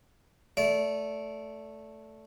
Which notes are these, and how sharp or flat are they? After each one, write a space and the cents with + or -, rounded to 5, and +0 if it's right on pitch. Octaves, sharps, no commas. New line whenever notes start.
A3 +0 D5 -25